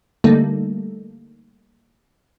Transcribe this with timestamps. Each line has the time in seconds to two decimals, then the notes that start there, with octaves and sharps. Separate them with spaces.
0.24 D3 G3 A3 A#3 D#4 A4